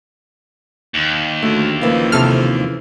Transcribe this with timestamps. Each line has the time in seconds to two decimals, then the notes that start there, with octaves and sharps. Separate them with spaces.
0.94 D#2
1.42 D2 A3
1.81 C#3 E3 F3 A#3
2.12 C3 A4 F6